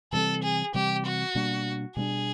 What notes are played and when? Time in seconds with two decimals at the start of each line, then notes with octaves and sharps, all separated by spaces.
0.12 C3 E3 G3 C4 A4
0.43 G#4
0.74 C3 E3 G3 C4 G4
1.05 F#4
1.35 B2 G3 A#3 D4
1.96 B2 G3 A#3 D4 G#4